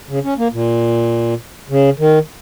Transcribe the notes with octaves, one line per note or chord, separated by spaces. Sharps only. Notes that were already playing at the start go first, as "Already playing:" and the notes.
C#3
C#4
A#3
A#2
C#3
D#3